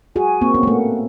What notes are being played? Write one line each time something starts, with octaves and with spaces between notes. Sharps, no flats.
F#4 G#4 G#5
A#3 C4 C#6
B3 C#4
A#3
A3 F#5